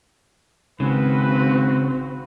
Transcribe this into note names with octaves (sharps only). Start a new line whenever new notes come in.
G#1 C#3 C4 F#4 B4